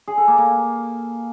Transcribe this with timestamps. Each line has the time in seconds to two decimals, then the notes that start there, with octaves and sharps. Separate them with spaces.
0.07 G#4
0.18 A4
0.28 A#3
0.38 A#3